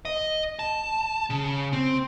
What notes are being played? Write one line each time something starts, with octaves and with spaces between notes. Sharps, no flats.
D#5
A5
C#3
C4